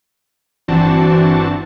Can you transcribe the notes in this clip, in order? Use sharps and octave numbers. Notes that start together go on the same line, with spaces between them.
G1 E3 C4 D4 F#4 A5